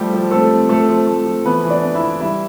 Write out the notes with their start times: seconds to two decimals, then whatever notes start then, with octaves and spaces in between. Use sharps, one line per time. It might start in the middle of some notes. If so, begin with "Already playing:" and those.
Already playing: F3 G3 A3 G4
0.13 F3
0.31 A3 C4 A4
0.51 C4
0.69 F3 A3 A4
0.89 F3
1.07 A3
1.26 F3
1.45 E3 B3 B4
1.64 E3
1.70 D4 D5
1.83 B3
1.95 E4 E5
2.02 E3
2.20 G3 E4 E5